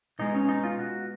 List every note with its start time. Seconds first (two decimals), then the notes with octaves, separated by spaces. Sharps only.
0.19 B2 G#3 D#4
0.34 C#4
0.49 D#4
0.64 F4
0.79 F#4